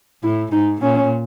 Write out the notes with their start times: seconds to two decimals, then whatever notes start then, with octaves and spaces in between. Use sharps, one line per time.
0.23 A2 E4
0.52 G#2 D#4
0.81 A#2 C#4